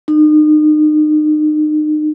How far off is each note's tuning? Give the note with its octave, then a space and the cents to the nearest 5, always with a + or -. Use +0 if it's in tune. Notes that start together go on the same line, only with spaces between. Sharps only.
D#4 -35